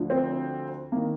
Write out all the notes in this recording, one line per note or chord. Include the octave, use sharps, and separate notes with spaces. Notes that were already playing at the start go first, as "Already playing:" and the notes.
Already playing: D2 D3 F3
C4
D#3 A#3